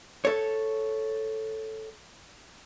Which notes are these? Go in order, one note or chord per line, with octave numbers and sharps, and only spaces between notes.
A4 C#5